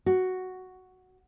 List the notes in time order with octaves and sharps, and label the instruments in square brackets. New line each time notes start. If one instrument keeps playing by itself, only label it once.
[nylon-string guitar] F#4